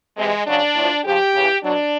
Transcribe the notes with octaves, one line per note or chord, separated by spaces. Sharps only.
C3 E3 G#3
C#3 F#3 D4
A2
F3
C#3 F3 G4
C#3 E3
B2 F#3 D4